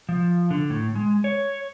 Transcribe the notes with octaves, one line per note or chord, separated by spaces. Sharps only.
F3
D3
A2
G#3
C#5